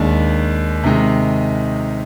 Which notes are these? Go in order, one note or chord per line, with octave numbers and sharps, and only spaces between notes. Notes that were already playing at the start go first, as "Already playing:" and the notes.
Already playing: D#2 D#3 G#3 D4
C3 D#3 G#3 D#4